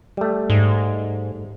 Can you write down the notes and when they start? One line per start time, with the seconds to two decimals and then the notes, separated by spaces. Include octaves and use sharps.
0.17 G3 A3
0.50 G#2